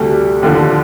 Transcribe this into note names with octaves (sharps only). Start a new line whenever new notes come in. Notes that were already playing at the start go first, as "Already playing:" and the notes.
Already playing: D2 C3 G3 A4
D#2 D3 F3